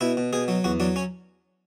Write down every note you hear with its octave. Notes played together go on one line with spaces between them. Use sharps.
B2 E4
B2
B2 G#4
F#3
E2 F#4
F#3 D4
C#4